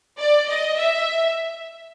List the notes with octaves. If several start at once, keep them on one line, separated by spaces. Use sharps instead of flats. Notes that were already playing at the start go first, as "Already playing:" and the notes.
D5
D#5
E5